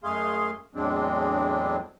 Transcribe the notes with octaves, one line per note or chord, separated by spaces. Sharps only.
F#2 G#3 A3 G#4 F5 C6
E2 A2 F#3 G#3 C4 D4